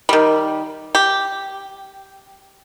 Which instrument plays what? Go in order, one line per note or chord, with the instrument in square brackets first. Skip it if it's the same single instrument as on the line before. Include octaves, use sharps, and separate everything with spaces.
[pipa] D#3 G3
G4